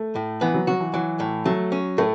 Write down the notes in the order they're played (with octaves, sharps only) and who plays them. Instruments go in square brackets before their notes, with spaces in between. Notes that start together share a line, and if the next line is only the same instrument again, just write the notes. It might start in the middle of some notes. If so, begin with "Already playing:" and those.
Already playing: [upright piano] A3
[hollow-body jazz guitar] A2
[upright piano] E3 [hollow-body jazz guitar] B3
[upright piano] F#3
[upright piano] F#3 [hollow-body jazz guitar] F#4
[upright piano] E3
[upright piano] E3 [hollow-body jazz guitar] F#3
[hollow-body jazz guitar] A2
[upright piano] F#3 [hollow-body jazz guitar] A3
[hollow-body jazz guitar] C#4
[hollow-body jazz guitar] A2 [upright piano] A3